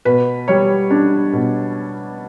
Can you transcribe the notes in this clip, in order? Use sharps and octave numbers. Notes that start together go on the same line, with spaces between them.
B2 B4
G3 C#5
D4
B2